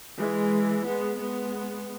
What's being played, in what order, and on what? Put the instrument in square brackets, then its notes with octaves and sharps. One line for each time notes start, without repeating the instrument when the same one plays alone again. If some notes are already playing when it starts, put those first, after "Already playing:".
[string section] E3 G#3
G#3 B3
G#3 B3